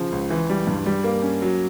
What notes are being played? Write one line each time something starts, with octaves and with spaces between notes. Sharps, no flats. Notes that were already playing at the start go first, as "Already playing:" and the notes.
Already playing: C#3 F3
C#2
E3
G3
G2
G3
A#3
C#4
F#3